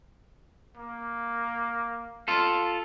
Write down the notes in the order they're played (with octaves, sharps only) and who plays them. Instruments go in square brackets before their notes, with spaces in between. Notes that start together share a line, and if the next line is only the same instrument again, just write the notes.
[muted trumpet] A#3
[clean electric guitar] F4 A4